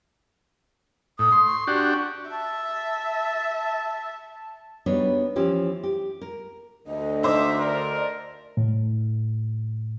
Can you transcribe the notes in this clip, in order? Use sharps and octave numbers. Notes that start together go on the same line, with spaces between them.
A2 D#6
C6
C#6
D4 F#4 G4
E5 A5
G3 B3 D4 D#4 F#4 C#5
E3 F3 C#4 E4 G4
G4
A#4
D2 D3 D#5
D#4 C5 E5 D6
A#4 D5
A2